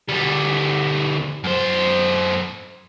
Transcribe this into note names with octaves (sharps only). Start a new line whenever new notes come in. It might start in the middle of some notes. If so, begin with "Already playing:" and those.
D2 G3
F#2 C5